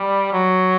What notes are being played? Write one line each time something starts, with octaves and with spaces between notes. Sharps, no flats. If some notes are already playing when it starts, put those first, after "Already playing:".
Already playing: G3
F#3